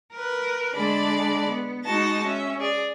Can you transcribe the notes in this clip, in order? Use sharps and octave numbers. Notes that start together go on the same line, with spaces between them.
A#4 B4
D3 G#3 D4 D5 B5
B3
G#3 D#4 F#4 D#5 A5 A#6
C#4 E5
G#4 D5